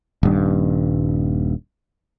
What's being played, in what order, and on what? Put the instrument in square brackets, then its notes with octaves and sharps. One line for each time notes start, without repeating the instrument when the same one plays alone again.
[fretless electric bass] D#1 G2